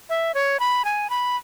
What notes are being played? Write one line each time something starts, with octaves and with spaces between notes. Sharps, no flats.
E5
C#5
B5
G#5
B5